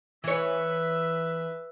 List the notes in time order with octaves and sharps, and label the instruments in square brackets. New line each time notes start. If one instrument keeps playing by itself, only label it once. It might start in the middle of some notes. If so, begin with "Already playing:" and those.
[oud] E3 C#5 [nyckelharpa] B4 E5